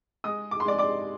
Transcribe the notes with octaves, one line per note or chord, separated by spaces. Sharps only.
G#3 D#5 D#6
D6
C6
G#3 D5 D6
D5 D6